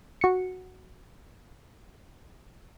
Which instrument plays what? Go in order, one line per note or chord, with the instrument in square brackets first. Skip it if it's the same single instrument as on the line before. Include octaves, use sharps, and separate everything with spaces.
[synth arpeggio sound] F#4 C#7